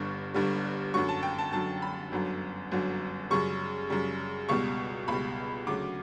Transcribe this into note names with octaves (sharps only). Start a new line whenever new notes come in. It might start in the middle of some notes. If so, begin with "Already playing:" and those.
Already playing: G1 G2 D3 G3 C#6
G1 G2 D3 G3
F#2 D3 F#3 C#6
A5
G5
A5
F#2 D3 F#3 A5
B5
G1 F#2 D3 F#3
G1 F#2 D3 F#3
F#2 C#3 G3 C#6
F#2 C#3 G3
C#2 B2 G3 C#6
C#2 B2 G3 B5
D2 C#3 F#3 D6